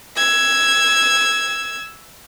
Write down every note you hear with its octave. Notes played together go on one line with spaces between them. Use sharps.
E6 G#6